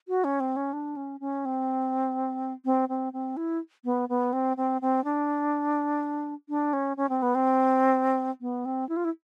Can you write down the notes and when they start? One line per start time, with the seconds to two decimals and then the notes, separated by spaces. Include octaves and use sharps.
0.08 F#4
0.24 C#4
0.40 C4
0.56 C#4
0.73 D4
0.96 C#4
1.20 C#4
1.45 C4
2.65 C4
2.89 C4
3.13 C4
3.37 E4
3.85 B3
4.09 B3
4.33 C4
4.57 C4
4.81 C4
5.04 D4
6.49 D4
6.73 C#4
6.97 C#4
7.09 C4
7.22 B3
7.35 C4
8.41 B3
8.65 C4
8.89 E4
8.97 F4
9.05 E4